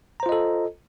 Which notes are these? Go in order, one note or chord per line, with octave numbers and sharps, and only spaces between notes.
F4 A4 C5 D#5 A#5